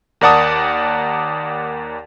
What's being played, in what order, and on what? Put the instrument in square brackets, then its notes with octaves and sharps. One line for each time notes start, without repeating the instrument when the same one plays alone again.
[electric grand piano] D#2 A#4 D5 F#5 A5 D#6